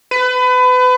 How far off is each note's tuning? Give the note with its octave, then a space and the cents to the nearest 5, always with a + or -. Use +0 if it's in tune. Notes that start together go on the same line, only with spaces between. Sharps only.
B4 +30